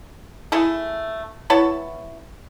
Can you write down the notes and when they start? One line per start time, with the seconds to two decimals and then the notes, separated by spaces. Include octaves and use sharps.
0.52 A3 E4 G#4 A4
1.50 B3 E4 C#5 A5